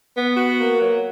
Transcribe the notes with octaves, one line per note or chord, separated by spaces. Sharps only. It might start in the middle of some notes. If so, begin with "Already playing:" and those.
B3
F#4
A#3
F#3